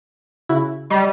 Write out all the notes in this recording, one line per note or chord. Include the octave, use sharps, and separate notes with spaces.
C#3 E4 F#4
G3 D#5